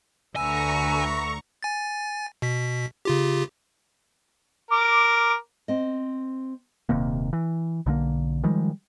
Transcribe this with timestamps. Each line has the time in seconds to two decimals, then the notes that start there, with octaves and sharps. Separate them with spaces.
0.36 D2 D3 B4 E5 G#5 A#5 C#6 E6
1.63 G#5 A6
2.42 B2 B6
3.05 C#3 F4 G4
4.71 A#4 D6
5.68 C4 D#5
6.89 D#1 D#2 C3 A#3
7.33 E3
7.86 B1 D3 G3 A#3
8.43 D#3 F3 G3 G#3